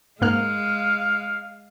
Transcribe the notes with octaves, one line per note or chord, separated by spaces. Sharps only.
G#2 G#3 A#3 F5 F6